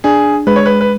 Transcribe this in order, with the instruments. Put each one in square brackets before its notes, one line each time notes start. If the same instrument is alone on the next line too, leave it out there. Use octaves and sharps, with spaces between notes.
[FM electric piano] D4 [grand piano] G#4
[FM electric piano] G#3 [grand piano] B4
[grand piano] C#5
B4
B4